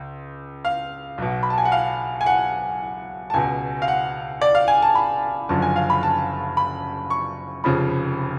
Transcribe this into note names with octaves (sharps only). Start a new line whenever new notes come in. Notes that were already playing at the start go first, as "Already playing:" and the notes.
Already playing: C#2
F5
B1 B2
B5
A5
G#5
F#5
F5
G#5
F#5
A5
C#2 B2 G#5
F5
F#5
D5
F5
G#5
A5
B5
F#1 F#2 D3 F3 A5
G#5
F5
B5
A5
B5
C#6
F1 F2 C#3 F3 B5